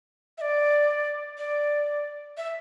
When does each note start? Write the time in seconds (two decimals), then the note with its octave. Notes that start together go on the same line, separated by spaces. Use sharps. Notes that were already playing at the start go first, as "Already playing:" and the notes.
0.38 E5
0.41 D5
1.38 D5
2.38 E5